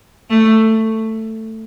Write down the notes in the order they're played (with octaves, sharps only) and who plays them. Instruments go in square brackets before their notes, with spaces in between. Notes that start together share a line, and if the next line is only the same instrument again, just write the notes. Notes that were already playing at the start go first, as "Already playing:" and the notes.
[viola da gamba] A3